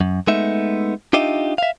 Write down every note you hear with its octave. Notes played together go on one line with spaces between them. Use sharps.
F#2
G#3 A3 B3 D#4 E5
D4 D#4 F4 G4 D#5 E5
E5 F5